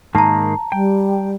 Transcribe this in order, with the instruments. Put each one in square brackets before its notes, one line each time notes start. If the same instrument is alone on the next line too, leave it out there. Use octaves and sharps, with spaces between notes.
[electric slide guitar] G#2 D#3 A#3 [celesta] A5 A#5
[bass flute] G3 [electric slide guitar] G5